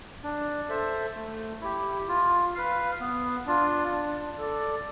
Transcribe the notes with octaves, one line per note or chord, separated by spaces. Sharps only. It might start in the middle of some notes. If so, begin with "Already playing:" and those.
D4
A4 C5 E5
A3
E4 G4
F4
B4 F5
B3
D4 F4
D4
A4 D5